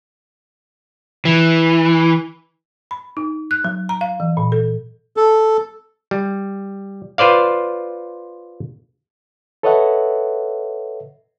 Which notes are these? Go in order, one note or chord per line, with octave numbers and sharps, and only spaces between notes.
E3
B5
D#4
F#6
F#3
A#5
F5
E3
A#2
A4
A4
G3
F4 B4 C5 D5 F5
A4 B4 C#5 D#5 E5 F#5